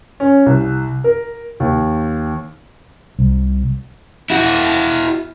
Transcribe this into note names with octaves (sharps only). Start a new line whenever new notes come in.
C#4
C2
A#4
D#2
C2
E4 F#4